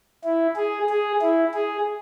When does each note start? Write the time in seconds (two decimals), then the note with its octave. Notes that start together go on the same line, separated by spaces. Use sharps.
0.25 E4
0.56 G#4
0.90 G#4
1.22 E4
1.54 G#4